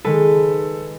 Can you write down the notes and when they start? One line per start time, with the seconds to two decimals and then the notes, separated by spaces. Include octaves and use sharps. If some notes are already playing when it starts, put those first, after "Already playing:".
0.05 D#3 G#3 A4 B4